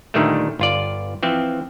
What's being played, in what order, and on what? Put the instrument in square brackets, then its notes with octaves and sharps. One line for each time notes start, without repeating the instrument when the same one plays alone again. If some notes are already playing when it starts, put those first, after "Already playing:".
[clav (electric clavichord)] D2 A#2 D3 D#3 G3 A3
G1 F4 D5
E3 F3 C4